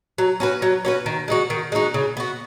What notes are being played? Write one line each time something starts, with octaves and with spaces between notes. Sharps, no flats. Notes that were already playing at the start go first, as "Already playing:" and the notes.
F#3
C#4 F#4 B4
F#3
C#4 F#4 B4
D#3
G#3 D#4 F#4
D#3
G#3 D#4 F#4
C#3
B3 F#4